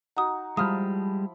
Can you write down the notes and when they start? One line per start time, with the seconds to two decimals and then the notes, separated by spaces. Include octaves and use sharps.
0.17 D#4 F#4 F#5 D#6
0.57 F3 G3 G#3 E4 B5 D#6 F6